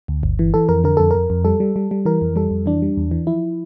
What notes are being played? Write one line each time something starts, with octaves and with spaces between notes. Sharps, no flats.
D2
G1
E3
E3 A4
F2 A#4
D3 A#4
F2 A4
F2 A#4
F2
G3 A4
G3
G3
G3
E3 A#4
F2
G3 A4
F2
E3 D4
G3
E2
E3
F3 E4